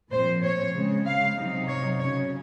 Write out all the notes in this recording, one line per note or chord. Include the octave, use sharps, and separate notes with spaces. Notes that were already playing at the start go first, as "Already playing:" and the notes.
A#2 F3 C4 C5
C#5
C#3 G#3 C4
F5
C3 F#3 C4 D#4
C#5
C#3 F#3 C#4 C#5